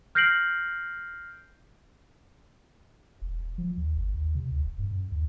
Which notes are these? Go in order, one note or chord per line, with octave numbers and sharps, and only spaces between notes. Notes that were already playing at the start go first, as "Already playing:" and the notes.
F6 G6 A#6 C7 D7 F#7
E1
E1
F3
D#2
G1
D#2
C3
D2
D#1
G2
F#2
D#2